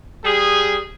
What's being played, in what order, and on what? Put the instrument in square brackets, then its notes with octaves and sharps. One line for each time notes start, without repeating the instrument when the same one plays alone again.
[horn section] G3 G#4